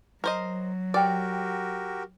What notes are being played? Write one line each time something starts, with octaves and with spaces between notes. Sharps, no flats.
F#3 A#4 C5 D#5
F#4 G4 A#4 B4 D5 G5